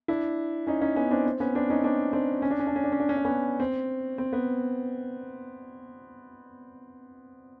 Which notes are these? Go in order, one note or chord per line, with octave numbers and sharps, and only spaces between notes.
D4 E4
C#4 D#4
C#4 D#4
B3 C#4
C4 D4
C4
B3 C#4
C4 D4
C#4 D#4
C4 D4
C4 D4
C#4
D4
C#4
D4
C#4
D4
C#4
D4
C#4
D4
B3 C#4
C4
C4
B3